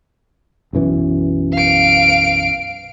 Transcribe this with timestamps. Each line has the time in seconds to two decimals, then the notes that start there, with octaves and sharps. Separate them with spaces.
0.73 B1 F#2 E3
1.53 F5 D7